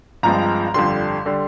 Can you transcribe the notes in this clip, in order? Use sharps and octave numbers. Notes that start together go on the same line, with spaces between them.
G1 G2 F3 G#3 C4 A#5
G1 F2 D3 G3 C6
D3 G3